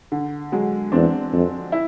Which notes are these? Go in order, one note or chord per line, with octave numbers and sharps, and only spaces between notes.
D3
F#3 G#3
E2 C4 D4
F2
E4